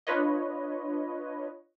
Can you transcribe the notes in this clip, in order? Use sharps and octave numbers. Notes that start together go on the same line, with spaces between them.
D4 F4 B4 C#5 D#5